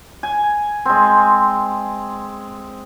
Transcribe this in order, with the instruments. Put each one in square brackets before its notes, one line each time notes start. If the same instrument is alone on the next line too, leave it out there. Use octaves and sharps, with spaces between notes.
[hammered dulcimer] G#5
G#3 C4